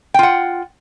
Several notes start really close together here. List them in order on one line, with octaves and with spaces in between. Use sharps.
G5 F4 F#5